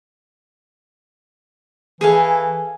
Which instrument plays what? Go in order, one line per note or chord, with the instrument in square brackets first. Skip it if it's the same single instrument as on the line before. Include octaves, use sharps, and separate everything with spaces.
[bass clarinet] E3 [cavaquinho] G#4 A4 F5